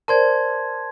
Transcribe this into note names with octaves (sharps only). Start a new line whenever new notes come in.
A#4 C5 D5 A5 C6 G#6